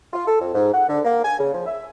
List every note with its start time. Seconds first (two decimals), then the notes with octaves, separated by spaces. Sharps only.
0.13 F4
0.27 A4
0.40 F2
0.54 G#2
0.74 F#5
0.89 D3
1.04 A#3
1.24 G#5
1.39 C#3
1.54 F3
1.67 E5